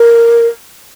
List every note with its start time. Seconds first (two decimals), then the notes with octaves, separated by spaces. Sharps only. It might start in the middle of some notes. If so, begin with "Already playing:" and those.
Already playing: A#4